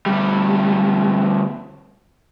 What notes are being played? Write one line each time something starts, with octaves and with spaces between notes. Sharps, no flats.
D2 G3